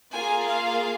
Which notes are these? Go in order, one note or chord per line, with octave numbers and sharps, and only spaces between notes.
A#3 F4 G#4 G#5
F5